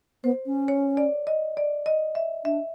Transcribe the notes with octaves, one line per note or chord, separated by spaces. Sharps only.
B3 C5
C#4
C#5
D5
D#5
D5
D#5
E5
D4 E5